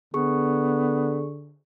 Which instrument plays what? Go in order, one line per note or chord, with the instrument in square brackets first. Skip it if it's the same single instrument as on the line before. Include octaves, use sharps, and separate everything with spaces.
[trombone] D3 [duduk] B3 [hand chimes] G#4 C#6